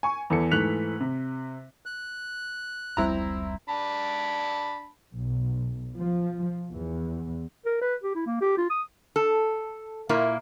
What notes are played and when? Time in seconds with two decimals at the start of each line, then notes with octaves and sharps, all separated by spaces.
0.03 G#5 C#6
0.30 E2 E3 A4 C#7
0.51 G#2 E3 A3 F#6 B6 F7
1.00 C3
1.86 F#6
2.97 F1 C#2 G3 C4 E4 A#5
3.69 D4 A5 B5
5.14 B1
5.96 F3
6.70 E2
7.66 A#4
7.81 B4
8.03 G4
8.15 E4
8.26 A#3
8.41 G4
8.57 F4
8.70 D#6
9.16 A4
10.09 A#2 A#3 E4 A#5